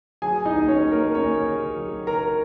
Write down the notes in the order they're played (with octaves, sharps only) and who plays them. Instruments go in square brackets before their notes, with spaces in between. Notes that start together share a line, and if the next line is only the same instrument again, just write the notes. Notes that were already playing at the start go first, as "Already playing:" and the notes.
[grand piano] F#3 G#4 G#5
D#4 D#5
D#2
C#4 C#5
D#2
A#4
D#2 C#4 C#5
C#3
F#3
C#3 A#4 A#5